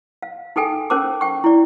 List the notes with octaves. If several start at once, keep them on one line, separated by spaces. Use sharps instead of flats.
F5
D#4 G#4 A4 G5 G#5
C#4 A#4 C5 A5 D6
G5 C#6
E4 D5